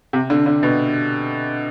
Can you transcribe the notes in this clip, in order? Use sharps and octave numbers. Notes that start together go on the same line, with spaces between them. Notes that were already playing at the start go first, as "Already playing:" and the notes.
C3
D3
D3
B2